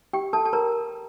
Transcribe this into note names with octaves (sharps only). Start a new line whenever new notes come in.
G4 G5
A4 A5
A5
A#4 A#5